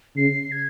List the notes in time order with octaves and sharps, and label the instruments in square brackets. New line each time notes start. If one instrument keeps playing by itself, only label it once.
[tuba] C#3 [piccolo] C7
[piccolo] G#6